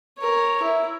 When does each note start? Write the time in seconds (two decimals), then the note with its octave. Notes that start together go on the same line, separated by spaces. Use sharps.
0.18 A#4 C#5
0.62 E4